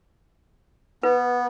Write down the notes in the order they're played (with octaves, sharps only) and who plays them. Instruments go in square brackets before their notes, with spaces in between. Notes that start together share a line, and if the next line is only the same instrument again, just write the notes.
[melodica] B3 [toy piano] B4